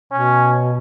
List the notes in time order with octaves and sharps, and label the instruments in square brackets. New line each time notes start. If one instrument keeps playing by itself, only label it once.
[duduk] B2 [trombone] C#4